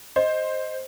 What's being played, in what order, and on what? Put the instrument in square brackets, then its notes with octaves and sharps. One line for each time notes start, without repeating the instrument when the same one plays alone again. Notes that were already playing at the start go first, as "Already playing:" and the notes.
[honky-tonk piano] C5 [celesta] D#5